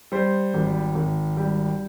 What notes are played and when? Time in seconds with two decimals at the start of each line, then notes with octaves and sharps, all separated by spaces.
0.12 G3 C5
0.54 G#1
0.95 G#1
1.37 G3